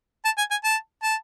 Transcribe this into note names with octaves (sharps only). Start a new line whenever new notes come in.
A5
G#5
G#5
A5
A5